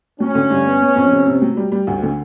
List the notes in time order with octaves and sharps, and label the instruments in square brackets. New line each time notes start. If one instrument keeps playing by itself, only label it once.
[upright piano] F#3 [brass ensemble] C#4
[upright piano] D3
G2
B3
B3
F2
C3
C3
F#3
G3
G3
D2
D3